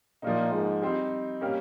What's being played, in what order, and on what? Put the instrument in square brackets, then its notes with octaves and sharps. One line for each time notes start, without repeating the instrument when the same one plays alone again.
[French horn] A#2 [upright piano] F3 A#3 D#4
[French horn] G#2
[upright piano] G3 C4 D#4
G3 A#3 C#4